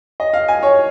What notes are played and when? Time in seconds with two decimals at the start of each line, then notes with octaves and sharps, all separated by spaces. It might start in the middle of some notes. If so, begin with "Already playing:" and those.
0.20 D#5
0.33 F5
0.48 G#5
0.63 C#5